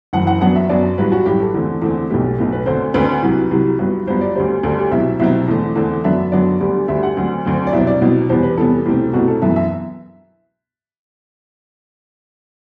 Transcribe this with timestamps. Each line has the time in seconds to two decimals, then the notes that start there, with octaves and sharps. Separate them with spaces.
0.13 F#1 F#2 E3 F#5
0.27 F#5
0.41 F#2 F#3 B3 D4 F#5
0.56 E5
0.69 F#2 F#3 B3 D4 D5
0.98 A1 G2 F#3 B4
1.12 F#4
1.26 A1 G2 F#3 G4
1.40 A4
1.54 E2 D3 A3 C4
1.82 E2 D3 A3 C4
2.10 B1 B2 A3 G4
2.38 B1 B2 A3
2.52 B4
2.66 D2 D3 A3 C4 C5
2.94 D2 D3 A3 C4 B4
3.22 C2 C3 F#3
3.51 C2 C3 F#3
3.79 G1 G2 F#3 B3
4.07 G1 G2 F#3 B3 C5
4.21 D5
4.35 D2 D3 G3 C5
4.63 D2 D3 G3 A4
4.78 G4
4.91 C2 B2 F#3 C4 E5
5.20 C2 B2 F#3 C4 E5
5.48 E2 D3 A3 C4
5.75 E2 D3 A3 C4
6.04 F#2 D3 F#3 B3 D4 E5
6.32 F#2 D3 F#3 B3 D4 D5
6.60 D2 D3 G3
6.88 D2 D3 G3 E5
7.03 F#5
7.17 D2 D3 F#3 C4
7.45 D2 D3 F#3 C4
7.67 D5
7.73 C2 B2 F#3 C4 E5
7.87 D5
8.01 C2 B2 F#3 C4
8.29 E2 C3 G3 B3 C5
8.43 B4
8.57 E2 C3 G3 B3 A4
8.86 C2 B2 A3 C4 G4
9.13 C2 B2 A3 C4 F#4
9.28 A4
9.42 F#2 E3 B3 E5
9.56 E5